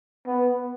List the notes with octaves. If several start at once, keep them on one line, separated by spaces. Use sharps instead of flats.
B3